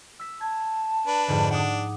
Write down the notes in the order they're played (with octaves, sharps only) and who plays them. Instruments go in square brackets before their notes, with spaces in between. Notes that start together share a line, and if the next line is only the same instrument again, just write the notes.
[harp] E6 B6
[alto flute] A5 [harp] G#6
[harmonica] D4 B4
[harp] F2 G#2 D3
[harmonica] D4 [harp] F#5 D6 D#6